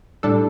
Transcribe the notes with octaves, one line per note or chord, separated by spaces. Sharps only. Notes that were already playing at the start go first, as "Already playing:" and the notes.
A2 G3 D4 A4